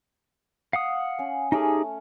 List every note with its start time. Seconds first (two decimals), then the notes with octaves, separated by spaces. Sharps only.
0.73 F5 F#5 D#6
1.19 C#4
1.52 A3 C#4 D#4 G4 G#4